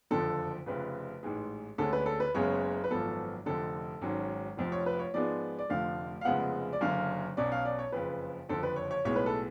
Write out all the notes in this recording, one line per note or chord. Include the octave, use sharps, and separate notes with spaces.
F#1 F2 D3 F3 A4
F1 F2 C#3 B4
A1 G#2 G#3
D2 D3 G#3 C#4 A4
B4
A4
B4
F#1 F#2 C#3 G#3 B3 C#5
B4
G#1 F#2 F3 B3 A4
F1 F2 D3 A4
G#1 G#2 F#3 C#4
F1 F2 F3
C#5
B4
C#5
G#2 F3 G#3 B3 D5
D5
F1 F2 D3 F3 A3 F5
F5
F1 F2 C#3 G#3 B3 F#5
D5
F#1 F#2 D3 F5
B1 B2 F#3 C#4 D5
F5
D5
C#5
F#1 F2 C#3 B4
F#1 F2 D3 A4
B4
C#5
C#5
B1 A2 G#3 B3 C#5
B4
A4